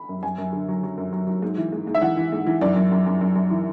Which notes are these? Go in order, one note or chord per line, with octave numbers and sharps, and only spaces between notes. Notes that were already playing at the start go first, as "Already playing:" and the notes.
Already playing: B5
F#2
F#2 G#5
F#2
D3
F#3
F#3
F#2
F#3
F#3
G#2
E3
G#2
G#2
E5
E3 F#5
E3
G#2
E3
F#2 D5
F#2
F#2
F#2
F#2
F#2
E3